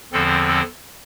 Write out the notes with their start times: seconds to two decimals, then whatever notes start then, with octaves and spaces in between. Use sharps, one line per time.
0.12 E2 D3 F3 C4 A4
0.48 A4